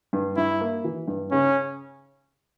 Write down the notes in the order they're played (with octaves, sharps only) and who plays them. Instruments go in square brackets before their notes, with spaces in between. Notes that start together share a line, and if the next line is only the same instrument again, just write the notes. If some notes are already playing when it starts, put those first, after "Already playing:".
[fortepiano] G2
[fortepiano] G2 [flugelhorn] E4
[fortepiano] A#3
E3
G2
[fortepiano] C#3 [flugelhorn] C#4